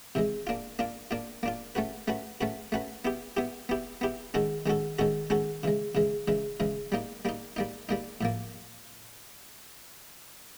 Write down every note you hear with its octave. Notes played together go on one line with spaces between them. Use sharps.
C3 E3 G#3
A#3 D4 F4
A#3 D4 F4
A#3 D4 F4
A#3 D4 F4
A3 C#4 F#4 B4
A3 C#4 F#4 B4
A3 C#4 F#4 B4
A3 C#4 F#4 B4
B3 E4 G4
B3 E4 G4
B3 E4 G4
B3 E4 G4
D#3 G#3 C#4 F#4 A4
D#3 G#3 C#4 F#4 A4
D#3 G#3 C#4 F#4 A4
D#3 G#3 C#4 F#4 A4
C#3 E3 G#3
C#3 E3 G#3
C#3 E3 G#3
C#3 E3 G#3
G3 A#3 D#4
G3 A#3 D#4
G3 A#3 D#4
G3 A#3 D#4
A2 F3 A#3